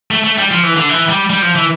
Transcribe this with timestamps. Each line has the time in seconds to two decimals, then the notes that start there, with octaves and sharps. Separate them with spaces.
0.11 A3
0.24 A3
0.38 G3
0.51 F3
0.63 E3
0.77 D3
0.89 E3
1.09 G3
1.30 G3
1.42 F3
1.55 E3